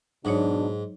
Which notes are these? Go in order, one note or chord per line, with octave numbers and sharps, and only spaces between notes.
G#2 B2 F#3 D4 D#4 C#5